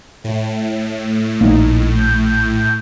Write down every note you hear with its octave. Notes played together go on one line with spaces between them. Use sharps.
A2
A#1 A#3 D#4
G6